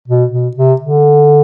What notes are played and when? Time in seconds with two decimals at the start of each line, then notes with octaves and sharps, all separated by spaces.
0.08 B2
0.32 B2
0.56 C3
0.81 D3